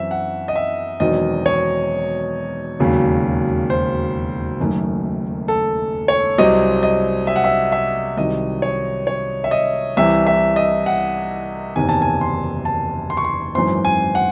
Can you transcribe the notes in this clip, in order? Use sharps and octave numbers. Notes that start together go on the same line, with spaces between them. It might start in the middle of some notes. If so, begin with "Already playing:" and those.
Already playing: F#2 E3 C4 E5
F#5
D#5
E5
E1 E2 D#3 F#3 C4 D#5
C#5
E1 D#2 C#3 F#3
C5
F#1 F#2 D#3 A3
A4
C#5
C2 C3 F#3 C4 D#5
D#5
E5
F#5
E5
E5
C2 C3 D#3 F#3 D#5
C#5
C#5
E5
D#5
C2 C3 E3 E5
E5
D#5
F#5
F#1 E2 C3 D#3 G#5
A5
G#5
C6
A5
C6
C#6
C6
G#1 F#2 E3 C4 C6
G#5
F#5